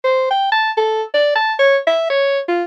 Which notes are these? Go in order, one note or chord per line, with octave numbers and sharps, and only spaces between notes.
C5
G5
A5
A4
D5
A5
C#5
E5
C#5
F4